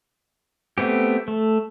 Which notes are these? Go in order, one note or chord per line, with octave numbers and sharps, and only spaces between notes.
A3 B3 C4 G4
A3